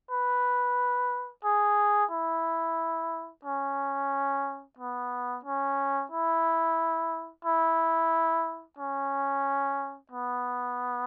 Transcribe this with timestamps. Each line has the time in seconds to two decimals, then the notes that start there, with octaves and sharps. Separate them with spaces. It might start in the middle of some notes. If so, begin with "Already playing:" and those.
0.11 B4
1.45 G#4
2.11 E4
3.45 C#4
4.78 B3
5.45 C#4
6.12 E4
7.45 E4
8.78 C#4
10.12 B3